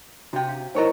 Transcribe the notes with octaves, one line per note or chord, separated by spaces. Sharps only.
C3 D4 F#4 F5 G5
F5
B1 D#4 E4 A#4 C5 C#5 D#5 A#5